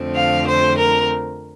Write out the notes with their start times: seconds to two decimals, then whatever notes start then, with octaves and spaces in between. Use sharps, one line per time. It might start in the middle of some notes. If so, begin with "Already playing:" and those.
Already playing: F2 D3 F3 A3 C4
0.15 F5
0.47 C5
0.78 A#4